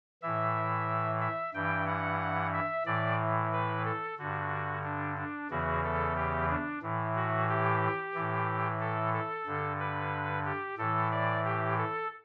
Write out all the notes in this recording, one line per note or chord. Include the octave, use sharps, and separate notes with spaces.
A2 E3 E5
E5
G2 E3 G5
F#5
E5
A2 E3 D5
B4
A4
G2 D3 F#4
D4
D4
E2 C#3 E3 F#4
A4
G4
D4
A2 E3
F#4
G4
A2 E3
A4
A4
G2 D3
B4
G4
A2 E3 A4
D5
G4
A4